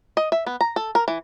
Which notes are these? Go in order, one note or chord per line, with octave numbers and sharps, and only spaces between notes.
D#5
E5
B3
A#5
A4
A#4
E3